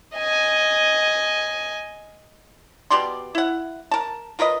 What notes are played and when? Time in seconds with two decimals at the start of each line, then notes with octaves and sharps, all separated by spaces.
0.15 D#5 G#5
2.91 B2 G4 D5 C6
3.35 E4 F#5
3.91 A#4 A5
4.39 F4 A#4 B4 D#5